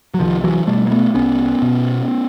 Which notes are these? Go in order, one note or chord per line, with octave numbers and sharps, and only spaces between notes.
F#3
C2 D#3 F3
E3 F#3
B2 G3 A3
A#3
A3 B3
C2 B3 C#4
B2